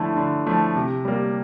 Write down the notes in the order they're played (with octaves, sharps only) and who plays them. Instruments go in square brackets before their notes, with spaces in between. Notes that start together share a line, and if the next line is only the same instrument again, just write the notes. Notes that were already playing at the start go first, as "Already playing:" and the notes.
Already playing: [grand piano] D3 F3 A3 E4
D3
F3 A3 E4
C3
G3 A#3